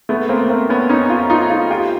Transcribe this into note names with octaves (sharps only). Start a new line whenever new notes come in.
A3 B3
A#3 C4
A#3 C4
B3 C#4
C#4 D#4
D#4 F4
D#4 F4
D#4 F4
F4 G4